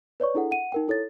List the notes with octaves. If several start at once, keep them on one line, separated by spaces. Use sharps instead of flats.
B4 C#5 D5 C#6
D4 E4 G#4 A4 F#5
F#5 D#7
D#4 A#4 G5
E4 A4 C#5 A6